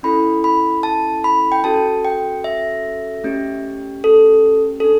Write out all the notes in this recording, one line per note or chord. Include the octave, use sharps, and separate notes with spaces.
C#4 E4 A4 B5
B5
A5
B5
G5
C#4 F#4 A4 A5
G5
E5
A3 C#4 G4
A4
A4
D4